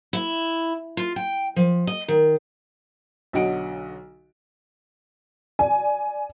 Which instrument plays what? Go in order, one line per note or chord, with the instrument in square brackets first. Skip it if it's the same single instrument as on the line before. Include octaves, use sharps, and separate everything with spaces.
[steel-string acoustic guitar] E4
F4
G5
F3
D#5
D#3
[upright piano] B1 D3 F#3 D#5 F#5 D7
[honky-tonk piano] D5 G#5